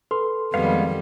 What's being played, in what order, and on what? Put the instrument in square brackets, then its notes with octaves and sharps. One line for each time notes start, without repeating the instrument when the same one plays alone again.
[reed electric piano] A4 C6 [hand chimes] B4
[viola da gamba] F2 D#3 G3 [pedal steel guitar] G#3 B3 F5 [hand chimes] B4